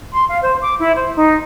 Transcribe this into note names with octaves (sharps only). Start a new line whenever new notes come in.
C6
F5
C5
D6
E4
C5
D#4